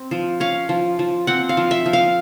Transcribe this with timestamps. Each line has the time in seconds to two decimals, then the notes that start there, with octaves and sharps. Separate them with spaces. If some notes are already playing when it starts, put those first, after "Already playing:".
Already playing: C4
0.11 F3
0.40 C#4 F5
0.69 F3
0.99 F3
1.27 C4 F#5
1.49 F5
1.57 F3
1.71 E5
1.86 F3
1.93 F5